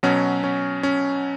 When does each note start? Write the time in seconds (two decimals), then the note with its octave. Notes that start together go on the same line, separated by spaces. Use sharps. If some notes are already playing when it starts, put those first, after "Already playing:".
0.03 B2 F#3 C#4
0.44 C#4
0.83 C#4